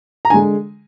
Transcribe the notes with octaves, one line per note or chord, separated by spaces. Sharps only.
A#5
D3 G#3 G#5